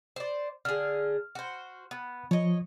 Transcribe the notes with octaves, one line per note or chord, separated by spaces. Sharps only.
C5 D5
D3 G#4 F6
F#4 C5
B3
F3 C#5 D#5